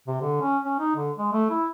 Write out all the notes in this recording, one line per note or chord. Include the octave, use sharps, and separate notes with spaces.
C3
D3
C#4
C#4
D#4
D3
G#3
A3
E4